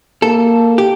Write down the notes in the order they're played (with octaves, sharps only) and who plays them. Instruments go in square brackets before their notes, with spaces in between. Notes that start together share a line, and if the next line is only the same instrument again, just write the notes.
[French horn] A#3 [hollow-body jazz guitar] A4
[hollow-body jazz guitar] G4